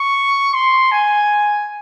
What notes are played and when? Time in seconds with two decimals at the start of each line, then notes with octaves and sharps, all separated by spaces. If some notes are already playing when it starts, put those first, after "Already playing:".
Already playing: C#6
0.54 C6
0.91 G#5